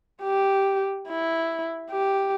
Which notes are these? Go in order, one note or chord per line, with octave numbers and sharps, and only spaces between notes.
G4
E4
G4